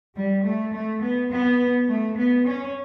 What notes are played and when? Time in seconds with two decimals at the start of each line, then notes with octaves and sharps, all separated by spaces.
0.15 G3
0.44 A3
0.73 A3
1.02 B3
1.30 B3
1.89 A3
2.17 B3
2.47 C#4